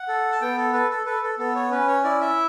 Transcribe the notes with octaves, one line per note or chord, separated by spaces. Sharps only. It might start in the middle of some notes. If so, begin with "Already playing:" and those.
Already playing: F#5
A4
A5
B3 G5
A4
A4 B4
A4
A4 B4
A4
B3 A4
C#5
C#4 B4
C#5
E4 D5
E5